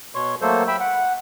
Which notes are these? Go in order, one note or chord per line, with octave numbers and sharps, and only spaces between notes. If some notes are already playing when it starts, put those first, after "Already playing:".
B2 C#5 C6 C#6
F#3 A3 A#3 A4 C5
E5 G5 B5 E6
F#5